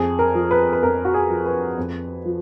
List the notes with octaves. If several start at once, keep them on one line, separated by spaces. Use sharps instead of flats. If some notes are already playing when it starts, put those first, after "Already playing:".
Already playing: F2 G#4
A#4
F3
B4
B4
F2 A#4
F#4
G#4
F3
B4
F2
F3